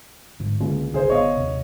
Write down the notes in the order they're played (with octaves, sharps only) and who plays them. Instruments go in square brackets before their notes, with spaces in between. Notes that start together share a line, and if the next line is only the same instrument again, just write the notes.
[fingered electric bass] G#1 G#2 D3
[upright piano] C#2 [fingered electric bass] D3 A#3
[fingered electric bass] D1 G1 C#3 [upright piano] G#4 C5
[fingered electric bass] G1 B3 [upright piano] C#5 D#5 F5
[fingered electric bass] D#2 C3